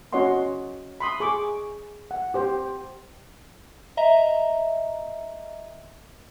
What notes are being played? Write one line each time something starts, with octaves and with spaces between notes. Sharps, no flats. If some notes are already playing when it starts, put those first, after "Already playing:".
C#4 F#4 C#5 D#5 F#5 C6
B5 C6 D#6
G#4 C#6 D6
F#5
G4 C5 G5
D#5 E5 A#5